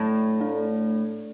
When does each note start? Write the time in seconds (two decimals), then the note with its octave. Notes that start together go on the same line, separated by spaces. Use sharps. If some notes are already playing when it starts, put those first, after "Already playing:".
Already playing: A2 F#3 D4 D5
0.40 A3 D4 A4 D5